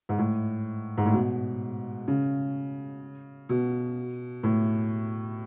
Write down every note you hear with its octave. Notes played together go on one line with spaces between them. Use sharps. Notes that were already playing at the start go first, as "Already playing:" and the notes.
G#2
A2
G#2
A2
B2
C#3
B2
A2